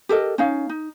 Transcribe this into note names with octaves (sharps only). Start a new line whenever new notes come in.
G4 A4 A#4 D#5
C#4 D#4 F5
D#4